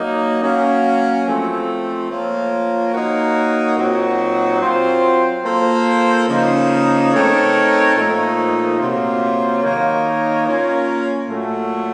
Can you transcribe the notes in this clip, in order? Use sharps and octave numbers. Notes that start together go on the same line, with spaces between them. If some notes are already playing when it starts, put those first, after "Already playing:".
Already playing: F#3 A#3 D#4
F#3 A#3 C#4
F3 A3 C4
F3 A#3 F4 A#4 C#5
A#3 D#4 F#4 A#4 C#5
A#2 F#3 C4 D#4 F#4
F#3 C4 F4 C5
A#3 F4 A4 C5
C#3 F3 A#3 D#4
A3 C4 D#4 A#4 C#5
A#2 F3 A3 D#4
C3 F#3 A#3 F4 C5
D#3 A#3 D#4 A#4 C#5
A#3 C#4 F4 A#4 C#5
A#2 F#3 A3